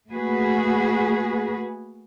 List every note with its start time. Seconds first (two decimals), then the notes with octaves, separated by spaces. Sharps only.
0.10 A3 A#3 F#4 G#4 B4